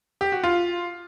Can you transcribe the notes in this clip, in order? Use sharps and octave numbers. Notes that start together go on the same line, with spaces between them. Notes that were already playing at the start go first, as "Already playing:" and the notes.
G4
F#4
F4